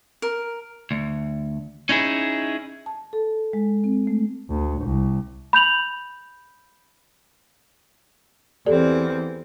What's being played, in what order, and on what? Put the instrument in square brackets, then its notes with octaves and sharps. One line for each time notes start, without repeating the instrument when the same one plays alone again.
[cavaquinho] A#4
[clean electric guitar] D2
C#4 D#4 E4 G#4
[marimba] A5
A4
G#3
C4
A3
[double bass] D2
C2
[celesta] B5 G6 F7 F#7
[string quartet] E2 C4 [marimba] G4 A4 D5